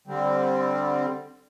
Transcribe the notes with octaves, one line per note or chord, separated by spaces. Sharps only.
D3 G3 C4